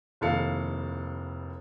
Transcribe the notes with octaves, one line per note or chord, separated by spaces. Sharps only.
F1 D#2 E4 A4 F5 C#7